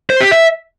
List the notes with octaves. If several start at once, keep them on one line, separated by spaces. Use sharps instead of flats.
C5
G4
E5